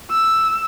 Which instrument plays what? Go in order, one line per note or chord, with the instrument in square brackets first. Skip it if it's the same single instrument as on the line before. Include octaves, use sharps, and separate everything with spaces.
[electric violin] E6